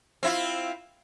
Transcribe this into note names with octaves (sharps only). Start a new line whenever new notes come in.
C4 E4 F4